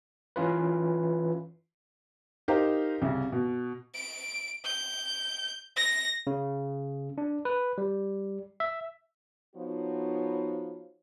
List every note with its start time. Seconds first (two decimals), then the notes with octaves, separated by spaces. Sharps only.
0.36 E3 C#4 F4 B4
2.48 D#4 G4 A#4 C5 D#5 F5
3.02 C2 C#3
3.32 B2
3.95 D7
4.65 G6
5.76 A#6
6.27 C#3
7.18 D4
7.45 B4
7.78 G3
8.60 E5
9.56 F3 B3 D#4 F#4 C#5